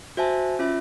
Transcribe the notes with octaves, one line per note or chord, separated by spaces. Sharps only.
F#4 C5 E5 G#5 A5
C#4 F4 E5